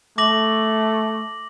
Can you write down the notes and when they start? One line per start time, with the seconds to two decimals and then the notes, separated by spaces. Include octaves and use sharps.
0.18 A3 D6 A#6 F#7